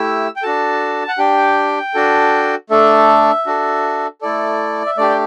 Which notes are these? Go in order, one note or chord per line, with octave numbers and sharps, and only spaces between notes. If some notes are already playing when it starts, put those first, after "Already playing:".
Already playing: A3 E4 G4 E6
G5
D4 F#4 A4 A5
F#5
D4 G4 G5
D4 F#4 A4
A3 D4 A4 E5
D4 F#4 A4
A3 E4 A4 D5
E5
A3 D4 G4 D5
G5